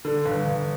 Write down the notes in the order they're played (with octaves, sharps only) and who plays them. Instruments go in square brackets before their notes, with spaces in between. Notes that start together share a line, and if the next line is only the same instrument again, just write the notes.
[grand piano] D3
G1
G1